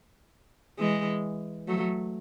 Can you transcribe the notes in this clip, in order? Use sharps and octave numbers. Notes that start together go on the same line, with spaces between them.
E3 G#3
F#3 A3